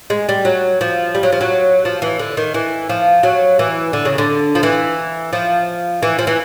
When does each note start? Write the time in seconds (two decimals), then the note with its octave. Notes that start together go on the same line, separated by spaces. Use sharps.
0.10 G#3
0.29 G3
0.45 F#3
0.81 F3
1.15 G3
1.23 F#3
1.32 F3
1.41 F#3
1.85 F3
2.02 E3
2.19 D3
2.37 D#3
2.54 E3
2.89 F3
3.23 F#3
3.59 E3
3.93 D3
4.05 C#3
4.18 D3
4.55 F3
4.63 E3
5.33 F3
6.03 E3
6.19 F3
6.27 E3